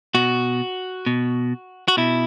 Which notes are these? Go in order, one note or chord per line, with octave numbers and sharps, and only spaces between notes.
B2 F#4
B2
F#4
B2 E4